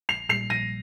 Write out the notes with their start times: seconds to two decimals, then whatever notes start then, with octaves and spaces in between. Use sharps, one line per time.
0.09 A#1 C7 F7
0.29 A#2 G3 C7 F7
0.50 A#1 A#6 D#7